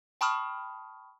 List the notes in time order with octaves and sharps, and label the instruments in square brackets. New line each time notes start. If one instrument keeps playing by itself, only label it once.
[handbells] G5 A5 B5 C#6 D#6 F6